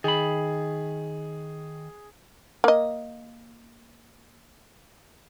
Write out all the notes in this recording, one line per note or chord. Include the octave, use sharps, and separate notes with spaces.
D#3 G#4 B5
A#3 D#5